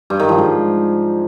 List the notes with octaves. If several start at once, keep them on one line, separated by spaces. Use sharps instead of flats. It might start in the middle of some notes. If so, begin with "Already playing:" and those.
G2
D#3
F3
G#2